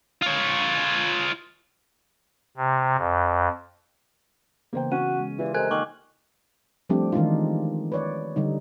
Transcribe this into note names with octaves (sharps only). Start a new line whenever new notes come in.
F4 C#5
C3
F2
C#3 E3 A#3 B3 C5 G5
C#4 F#4 D#7
G#3
E3 F4 G4 D5
C3 A4 A#4 D#5 G#5 F#6 G#6
D#3 A#3 C#6 D6 F#7
F3 G3 A3 C4 D4 G4
D#3 E3 G#3 D4 D#4 F4
B4 C#5 D5
D3 G3 D#4